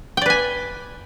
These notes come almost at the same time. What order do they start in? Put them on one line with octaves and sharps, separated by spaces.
G5 D5 B4 G#5